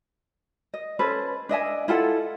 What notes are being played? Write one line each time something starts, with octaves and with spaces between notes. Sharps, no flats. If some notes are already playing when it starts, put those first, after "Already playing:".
D#5
C#4 A4 B4 C5
D4 D#5 E5 G#5
E4 F4 A4 F#5